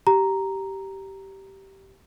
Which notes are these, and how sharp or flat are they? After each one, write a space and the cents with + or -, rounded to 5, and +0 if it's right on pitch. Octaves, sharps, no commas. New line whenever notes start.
G4 -15 A#5 +0